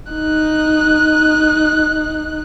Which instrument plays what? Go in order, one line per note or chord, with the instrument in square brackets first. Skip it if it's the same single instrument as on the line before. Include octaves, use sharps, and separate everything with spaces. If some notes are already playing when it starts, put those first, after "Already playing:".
[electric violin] D#4 F#6